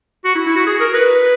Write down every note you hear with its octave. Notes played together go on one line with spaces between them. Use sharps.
F#4
E4
E4
F#4
G#4
A#4
B4